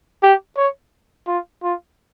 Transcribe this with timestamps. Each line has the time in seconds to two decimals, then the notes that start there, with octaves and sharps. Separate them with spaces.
0.23 G4
0.58 C#5
1.27 F4
1.63 F4